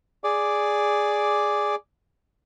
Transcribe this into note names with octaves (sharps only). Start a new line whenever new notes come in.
G#4 D5 D6